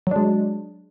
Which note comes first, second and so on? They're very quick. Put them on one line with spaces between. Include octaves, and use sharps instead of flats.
F#3 D4 G#3